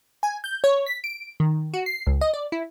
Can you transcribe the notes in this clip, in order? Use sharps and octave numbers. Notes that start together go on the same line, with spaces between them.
G#5
G6
C#5
B6
D7
D#3
F#4
C7
C#2
D#5
D5
E4